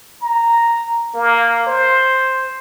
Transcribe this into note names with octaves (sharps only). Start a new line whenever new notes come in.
A#5
A#3
C5